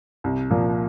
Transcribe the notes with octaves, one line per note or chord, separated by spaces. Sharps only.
C2
A#2 F3 A#3